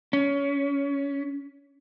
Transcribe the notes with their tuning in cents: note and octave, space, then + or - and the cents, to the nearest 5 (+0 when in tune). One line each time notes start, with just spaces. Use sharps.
C#4 +20